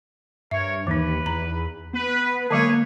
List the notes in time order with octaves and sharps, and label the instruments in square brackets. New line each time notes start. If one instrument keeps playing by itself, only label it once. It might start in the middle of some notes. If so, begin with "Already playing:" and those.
[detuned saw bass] G2 [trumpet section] A#4 C#5 [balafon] E5
[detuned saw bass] D#2 [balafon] E3 D#4 [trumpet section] B4
[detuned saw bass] E2 [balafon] A#5
[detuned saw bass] B3 [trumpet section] B4
[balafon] D3 F#3 G#3 [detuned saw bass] A#3 [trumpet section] G#4 B4 C#5